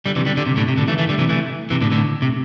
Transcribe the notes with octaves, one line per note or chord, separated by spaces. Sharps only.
D3 G3
C3 E3
D3 G3
D3 G3
C3
A2 D3
C3
A2 D3
E3 A3
E3 A3
D3 G3
C3 E3
E3 A3
C3 E3
A2 D3
A2 D3
C3